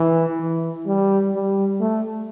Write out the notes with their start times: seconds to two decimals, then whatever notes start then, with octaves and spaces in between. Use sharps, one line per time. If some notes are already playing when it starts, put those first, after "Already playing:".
Already playing: E3
0.40 E3
0.86 G3
1.33 G3
1.80 A3